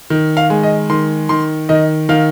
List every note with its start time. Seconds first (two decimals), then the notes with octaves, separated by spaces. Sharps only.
0.10 D#3
0.37 F5
0.50 G#3
0.63 D#5
0.90 D#3 C6
1.29 D#3 C6
1.69 D#3 D#5
2.09 D#3 F5